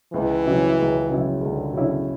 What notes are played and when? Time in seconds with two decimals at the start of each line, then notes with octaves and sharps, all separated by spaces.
0.13 C#2 E3
0.46 C#3 F#3 C#4 E4
0.78 C#2
1.10 C#3 F#3 C#4 E4
1.41 C#2 D3
1.73 C#3 F#3 C#4 E4